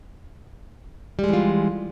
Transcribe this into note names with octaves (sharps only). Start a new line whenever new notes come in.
E3 G3 G#3 F4